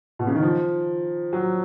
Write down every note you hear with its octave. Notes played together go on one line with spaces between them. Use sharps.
B2
C#3
D#3
F3
F#3